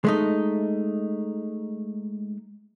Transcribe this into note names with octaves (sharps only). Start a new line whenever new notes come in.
G#3 A3 D#4